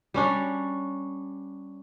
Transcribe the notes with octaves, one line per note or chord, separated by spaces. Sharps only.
G3 C#4 D4 C#5